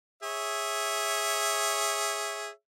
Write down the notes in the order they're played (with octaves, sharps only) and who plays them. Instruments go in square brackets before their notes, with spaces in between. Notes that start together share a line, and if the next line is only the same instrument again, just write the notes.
[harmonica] G#4 C#5 E5